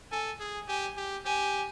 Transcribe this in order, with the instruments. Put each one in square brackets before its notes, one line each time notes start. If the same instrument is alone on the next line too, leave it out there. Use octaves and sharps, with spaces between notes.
[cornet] A4 [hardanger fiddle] G#5
[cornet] G#4
[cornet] G4 [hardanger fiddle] G#5
[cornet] G4
[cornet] G4 [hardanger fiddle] G#5